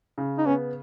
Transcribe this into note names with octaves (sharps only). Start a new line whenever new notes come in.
C#3
D#4
B3 C#4